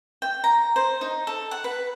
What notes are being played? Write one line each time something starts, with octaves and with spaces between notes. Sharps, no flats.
G5
A#5
C5
D#4
A4
F#5
B4